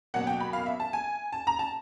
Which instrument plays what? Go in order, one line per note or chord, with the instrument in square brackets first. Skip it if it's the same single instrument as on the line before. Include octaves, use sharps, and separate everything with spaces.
[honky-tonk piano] B2 F#3 A#3 F#5
G5
B5
F5
E5
A5
G#5
A5
A#5
A5